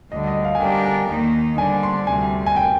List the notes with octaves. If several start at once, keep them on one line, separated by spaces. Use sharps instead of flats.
D2 D3 G3 D#5
D#5
F5
G#5
D3 G3 D4 G4 A#4 G5
G#5
D#2 D#3 A#3 D#4
D3 G3 D4 G#5
C6
D2 C3 G3 G#5
G#5
G5